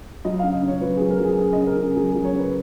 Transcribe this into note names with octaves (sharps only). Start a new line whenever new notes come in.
F#3 D#5
C#3 F5
D#5
C#3 C#5
F#3 B4
F#3 G#4
A#4
F#3 G#4
C#3 G#4
C#3 D#5
A#4
C#3 G#4
F#3 G#4
F#3 G#4
C#5
C#3
B4